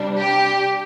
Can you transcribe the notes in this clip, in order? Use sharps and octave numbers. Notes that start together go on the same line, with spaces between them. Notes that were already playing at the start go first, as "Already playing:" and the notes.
Already playing: C3 G3 D4
G4